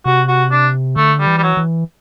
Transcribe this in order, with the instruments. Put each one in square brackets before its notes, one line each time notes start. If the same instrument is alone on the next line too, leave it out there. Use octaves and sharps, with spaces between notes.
[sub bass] C3 [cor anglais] F#4
[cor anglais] F#4
D4
[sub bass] D3 [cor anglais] A3
[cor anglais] G3
[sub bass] E3
[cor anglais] G3
F#3
[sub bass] E3